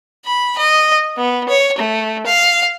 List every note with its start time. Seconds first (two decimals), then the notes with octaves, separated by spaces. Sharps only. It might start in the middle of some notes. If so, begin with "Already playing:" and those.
0.25 B5
0.58 D#5
1.17 B3
1.49 C#5
1.78 A3
2.26 F5